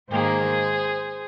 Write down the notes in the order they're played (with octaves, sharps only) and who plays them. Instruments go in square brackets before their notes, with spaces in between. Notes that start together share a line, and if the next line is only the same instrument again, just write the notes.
[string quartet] G#2 D#3 A#3 G#4 C5